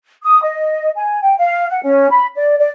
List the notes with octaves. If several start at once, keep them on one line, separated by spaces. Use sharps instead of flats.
D#6
D#5
G#5
G5
F5
F#5
C#4
B5
D5
D5